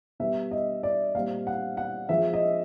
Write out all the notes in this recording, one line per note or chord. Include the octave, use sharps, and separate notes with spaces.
B2 G3 B3 E5
D#5
D5
A#2 G3 C4 F5
F#5
F#5
F3 G#3 C4 E5
D#5